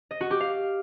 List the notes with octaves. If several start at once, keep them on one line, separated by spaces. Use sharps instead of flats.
D#5
F#4
G4
F5